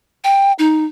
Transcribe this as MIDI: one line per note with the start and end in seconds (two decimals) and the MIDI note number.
0.24 0.52 79
0.59 0.85 63